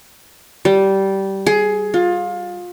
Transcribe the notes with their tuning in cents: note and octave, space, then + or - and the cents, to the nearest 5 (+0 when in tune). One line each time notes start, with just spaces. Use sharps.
G3 -15
G#4 +15
F4 +25